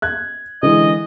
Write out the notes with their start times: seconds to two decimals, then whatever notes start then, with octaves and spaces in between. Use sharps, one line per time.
0.02 F#6 G#6
0.63 D3 E3 G#3 D#5